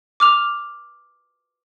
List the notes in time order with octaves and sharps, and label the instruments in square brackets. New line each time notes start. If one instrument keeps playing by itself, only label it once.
[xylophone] D6 F6 F7